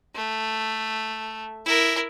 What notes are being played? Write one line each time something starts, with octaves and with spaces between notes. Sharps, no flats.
A3
E4 A#4